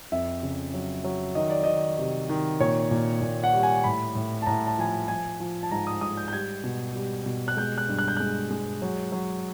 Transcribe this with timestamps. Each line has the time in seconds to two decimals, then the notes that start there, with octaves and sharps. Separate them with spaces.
0.12 F2 E5
0.43 C#3
0.74 F#3
1.04 F#3
1.35 D#3 D#5
1.50 D5
1.64 D#3 D#5
1.98 C3
2.29 D#3
2.60 A#2 C#5
2.91 A#2
3.22 A#2
3.44 F#5
3.54 G3
3.63 G#5
3.84 A2 B5
4.15 A2
4.42 A5
4.46 A2 A#5
4.67 A5
4.78 F3 G#5
4.88 A5
5.08 F3 G#5
5.40 F3
5.63 A5
5.71 G#2 A#5
5.87 D#6
6.01 G#2 D#6
6.17 G6
6.28 G6
6.33 G3 G#6
6.64 B2
6.95 G3
7.26 B2
7.48 F#6
7.57 G#3 G6
7.78 F#6
7.89 G2
7.98 F#6
8.08 G6
8.17 G#3 F#6
8.51 G#3
8.82 F#3
9.12 F#3